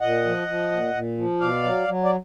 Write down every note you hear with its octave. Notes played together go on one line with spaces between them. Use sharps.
A#2 D#5 F#5
F3
F3
A#2
A#2
F3
B2 D5 F5
F#3
F#3
D5